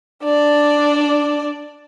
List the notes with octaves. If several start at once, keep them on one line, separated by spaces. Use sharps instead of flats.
D4 D5